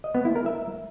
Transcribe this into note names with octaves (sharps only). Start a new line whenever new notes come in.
D#5
B3
E4
A#4
E5